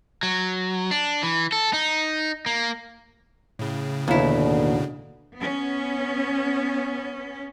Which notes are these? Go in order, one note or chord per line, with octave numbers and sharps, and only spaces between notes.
F#3
D4
E3
A4
D#4
A#3
A2 C#3
D#2 B2 D3 E4
B3 C#4